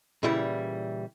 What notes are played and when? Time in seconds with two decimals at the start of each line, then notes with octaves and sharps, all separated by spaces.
0.23 A#2 C#3 E3 G3 E4